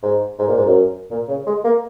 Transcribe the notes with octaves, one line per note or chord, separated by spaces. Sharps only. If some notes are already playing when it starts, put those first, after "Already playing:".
G#2
G#2
A#2
G#2
F#2
A#2
C#3
G#3
A#3